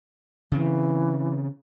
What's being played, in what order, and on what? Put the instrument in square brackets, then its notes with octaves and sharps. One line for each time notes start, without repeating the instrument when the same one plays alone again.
[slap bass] C#3 C4 [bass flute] E3